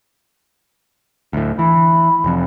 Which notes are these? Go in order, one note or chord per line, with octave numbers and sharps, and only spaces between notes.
D2 A2
E3 B5
F1 F2